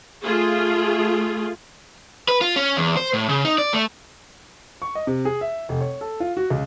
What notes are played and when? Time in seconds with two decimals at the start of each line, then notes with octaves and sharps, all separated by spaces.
0.23 A3 F4 G#4
2.28 B4
2.41 F4
2.56 C#4
2.77 E2
2.97 C5
3.14 A2
3.29 C#3
3.45 D#4
3.58 D5
3.74 A3
4.82 C#6
4.95 D#5
5.07 C3
5.25 G#4
5.41 E5
5.69 F1
5.81 C#5
6.01 A4
6.20 F4
6.37 F#4
6.50 C#2